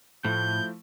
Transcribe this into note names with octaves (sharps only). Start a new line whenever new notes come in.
A2 F3 A3 E4 G6